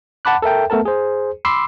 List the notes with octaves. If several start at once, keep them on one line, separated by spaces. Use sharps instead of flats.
F#5 A5 B5 D6 F#6
A4 A#4 E5 G5
A3 B3 A4 A#4 A5
G#4 C5
B5 C6 D6 E6 C7